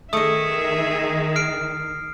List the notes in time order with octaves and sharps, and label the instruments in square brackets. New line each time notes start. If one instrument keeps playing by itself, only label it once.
[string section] D#3 [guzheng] A3 D#5 [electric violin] G#4 E5 [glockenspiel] D#6 C#7
[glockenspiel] F6 C7 D7